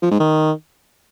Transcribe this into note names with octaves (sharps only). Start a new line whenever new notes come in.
F3
G#2
D#3